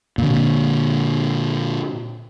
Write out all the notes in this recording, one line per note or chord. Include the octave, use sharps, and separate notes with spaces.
A#2 D3